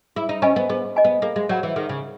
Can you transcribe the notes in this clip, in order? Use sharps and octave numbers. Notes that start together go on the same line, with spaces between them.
E4 G#4
D#4
C#4 D#5 G#5 B5
B3
B3 G#4
D#5 G#5 B5
B3
A#3 G#4
G#3
F#3 C#5 F#5 B5
E3
D#3 G#4
C#3